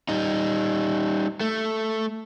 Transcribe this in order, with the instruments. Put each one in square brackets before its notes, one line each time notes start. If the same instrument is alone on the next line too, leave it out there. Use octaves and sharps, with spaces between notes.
[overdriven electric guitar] G3 D#4
A3